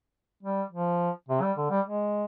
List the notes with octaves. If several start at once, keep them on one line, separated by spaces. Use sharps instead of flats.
G3
F3
C3
G3
D3
G3
G#3